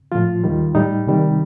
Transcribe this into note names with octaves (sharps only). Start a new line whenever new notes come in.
A2 F3 F4
D#2 D#3 G3
A2 G3 D#4
C2 C3 D#3 G3